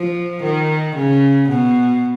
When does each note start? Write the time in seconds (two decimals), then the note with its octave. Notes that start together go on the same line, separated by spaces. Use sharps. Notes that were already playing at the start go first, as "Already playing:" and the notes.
Already playing: F3
0.43 D#3
0.96 C#3
1.49 B2